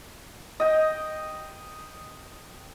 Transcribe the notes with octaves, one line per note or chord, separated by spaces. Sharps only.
D#5 G5